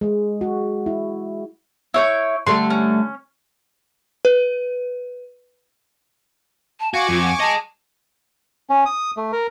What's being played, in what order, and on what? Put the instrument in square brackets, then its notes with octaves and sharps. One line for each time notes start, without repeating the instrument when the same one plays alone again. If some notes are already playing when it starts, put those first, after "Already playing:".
[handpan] G#3
F#4
E4
[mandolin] E4 C#5 G6
[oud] D3 G3 A3 [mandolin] C6
[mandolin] C#4
[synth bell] B4
[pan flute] A5
[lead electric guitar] F#4 [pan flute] F5 [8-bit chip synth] G#5 C#6 D6
[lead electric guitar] F2 [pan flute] F4
[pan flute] F#5
[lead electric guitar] G#4 D#5 [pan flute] A5
[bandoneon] C#4
D#6
A3
A#4